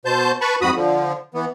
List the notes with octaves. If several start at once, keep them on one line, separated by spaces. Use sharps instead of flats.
B2 C5 A5 G6
B4 A5 B5 C#6
F2 G#2 F#4 B5 D#6
D3 F3
E3 B3